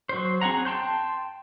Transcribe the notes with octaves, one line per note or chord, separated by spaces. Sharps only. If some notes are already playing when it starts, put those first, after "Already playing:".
F#3 C5
C4 G#4 F#5 A#5
G5 A5 C6 G6